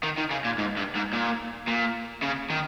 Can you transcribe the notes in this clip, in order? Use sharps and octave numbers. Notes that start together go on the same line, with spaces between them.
D#3
D#3
C#3
A#2
G#2
G2
G#2
A#2
A#2
C#3
D#3